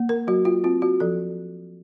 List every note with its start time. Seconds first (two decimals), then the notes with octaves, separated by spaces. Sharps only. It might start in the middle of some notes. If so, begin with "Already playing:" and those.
Already playing: A#3
0.09 A#4
0.27 F#3 F#4
0.45 F4
0.64 C4 F4
0.82 F#4
1.00 F3 A4